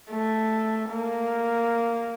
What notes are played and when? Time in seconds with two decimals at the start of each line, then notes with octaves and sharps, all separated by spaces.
0.11 A3
0.91 A#3